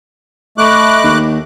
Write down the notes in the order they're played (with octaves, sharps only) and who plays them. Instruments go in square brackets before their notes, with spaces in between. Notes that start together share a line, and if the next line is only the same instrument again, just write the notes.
[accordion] A3 D6 F#6 [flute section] D#5 B5 C#6
[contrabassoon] D#2